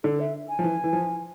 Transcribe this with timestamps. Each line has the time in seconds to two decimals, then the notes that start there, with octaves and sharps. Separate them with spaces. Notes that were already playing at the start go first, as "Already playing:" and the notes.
0.04 D3 A4
0.20 E5
0.49 G#5
0.59 F3
0.64 E3
0.84 E3
0.93 F3